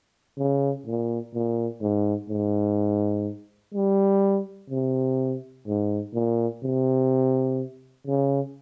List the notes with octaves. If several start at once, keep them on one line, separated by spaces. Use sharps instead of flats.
C#3
A#2
A#2
G#2
G#2
G3
C3
G#2
A#2
C3
C#3